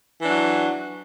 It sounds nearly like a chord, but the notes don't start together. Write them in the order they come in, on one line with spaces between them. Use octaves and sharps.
E3 D4 F#3